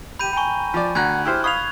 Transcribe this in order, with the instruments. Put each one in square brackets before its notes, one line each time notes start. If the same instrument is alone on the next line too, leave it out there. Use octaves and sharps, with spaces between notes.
[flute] G4 [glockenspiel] B5 G6 D#7
[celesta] G5 G#5 [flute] A#5 [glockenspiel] B5 C#6
[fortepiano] F3 D5
[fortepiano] D2 A#5 [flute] F#5 [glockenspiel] F#6 G#6
[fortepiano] E4 G4 C5 [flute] F6
[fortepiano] F5 B5 D#6 [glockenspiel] C#6 F7 [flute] G#6